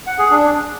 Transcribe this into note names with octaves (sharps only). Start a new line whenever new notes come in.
F#5
G#4
D4